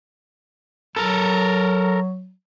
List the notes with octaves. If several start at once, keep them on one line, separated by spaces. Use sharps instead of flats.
F#3 A4 A#4